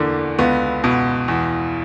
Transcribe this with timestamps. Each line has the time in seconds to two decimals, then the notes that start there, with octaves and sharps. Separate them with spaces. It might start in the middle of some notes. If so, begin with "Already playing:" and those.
Already playing: E2 D3 A#3
0.39 C#2 B3
0.84 B2
1.28 E2